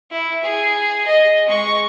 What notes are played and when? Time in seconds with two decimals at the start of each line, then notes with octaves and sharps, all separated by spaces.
0.11 E4
0.44 G#4
1.07 D#5
1.47 G#3 C#6